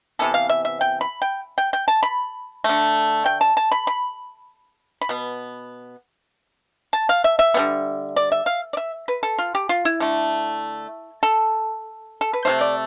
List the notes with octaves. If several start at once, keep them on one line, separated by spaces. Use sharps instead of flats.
C3 E3 B3 A4
F5
E5
E5
G5
B5
G5
G5
G5
A5
B5
D3 A3
G5
A5
A5
B5
B5
B5
B2 B3
A5
F5
E5
E5
D3 G3 B3
D5
E5
F5
D5
E5
B4
A4
F4
G4
F4
E4
D3 A3
A4
A4
B4
C3 F3 A3 C5
D5